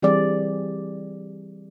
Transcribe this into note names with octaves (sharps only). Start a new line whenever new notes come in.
E3 G3 C4 G#4 D5